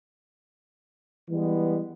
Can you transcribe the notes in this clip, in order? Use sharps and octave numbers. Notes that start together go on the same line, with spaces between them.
E3 G3 G#3 B3